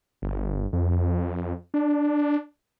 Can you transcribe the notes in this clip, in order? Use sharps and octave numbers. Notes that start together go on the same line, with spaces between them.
G1
F2
D4